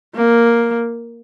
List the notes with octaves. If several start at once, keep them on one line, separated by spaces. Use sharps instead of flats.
A#3